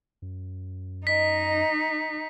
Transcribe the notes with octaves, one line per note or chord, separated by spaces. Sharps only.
F#2
D#4 D#5 B6